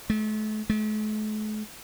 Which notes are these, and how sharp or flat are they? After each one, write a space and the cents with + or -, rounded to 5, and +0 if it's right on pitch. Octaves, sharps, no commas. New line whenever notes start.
A3 -40
A3 -45